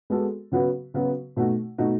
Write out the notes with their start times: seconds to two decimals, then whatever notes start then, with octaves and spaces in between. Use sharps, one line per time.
0.10 G#3 B3 F#4 A4
0.52 C#3 F#3 B3 F#4 B4
0.94 C#3 F#3 B3 F#4 B4
1.37 B2 A3 D#4 F#4
1.78 B2 A3 D#4 F#4